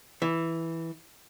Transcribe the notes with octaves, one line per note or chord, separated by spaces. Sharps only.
E3